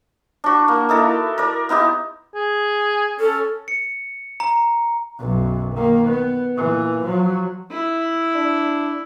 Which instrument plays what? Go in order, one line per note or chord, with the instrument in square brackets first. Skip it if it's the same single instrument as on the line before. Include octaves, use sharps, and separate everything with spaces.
[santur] D4 F#4
A#3
D#4 E4 A4 A#4
A#4 D5
B3 D#4 E4 G4
[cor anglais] G#4
[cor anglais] C#4 [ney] A4
[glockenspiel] C#7
A#5
[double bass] B1 F#2
D#3 A#3
B3
A#2 E3
F3 F#3
[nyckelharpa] E4
[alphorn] D4